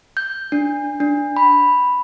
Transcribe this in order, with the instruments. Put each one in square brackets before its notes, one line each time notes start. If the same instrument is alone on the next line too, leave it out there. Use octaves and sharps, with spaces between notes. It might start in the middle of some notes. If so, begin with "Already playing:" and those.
[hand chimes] G6
D4
D4
B5